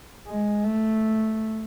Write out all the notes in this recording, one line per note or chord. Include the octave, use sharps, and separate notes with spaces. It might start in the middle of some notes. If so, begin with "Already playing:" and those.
G#3
A3